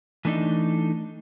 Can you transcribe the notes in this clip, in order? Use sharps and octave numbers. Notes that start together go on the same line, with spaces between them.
E3 A3 D4 D#4